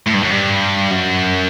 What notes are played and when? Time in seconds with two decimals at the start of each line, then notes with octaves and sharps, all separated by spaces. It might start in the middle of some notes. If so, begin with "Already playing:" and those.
0.07 A2
0.15 G2
0.23 F#2
0.31 G2
0.91 F#2